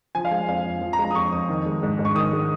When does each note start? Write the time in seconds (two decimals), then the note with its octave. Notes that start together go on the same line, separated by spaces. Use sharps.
0.15 F3 G#5
0.25 F5
0.31 G#3 G#5
0.49 F2 F5
0.65 F2
0.81 F3
0.93 A#5
0.99 G#3
1.04 A#5
1.11 D#6
1.15 F2 C#6
1.32 F2 D#6
1.49 D#3
1.66 G#3
1.83 G#2
1.99 G#2
2.05 C#6
2.15 D#3 D#6
2.33 G#3